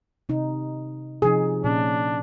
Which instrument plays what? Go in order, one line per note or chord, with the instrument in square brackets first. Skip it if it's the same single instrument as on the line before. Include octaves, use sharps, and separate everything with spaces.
[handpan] C3 D#4
[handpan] C3 F3 D#4 [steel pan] G#4
[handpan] A#2 C#4 [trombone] D4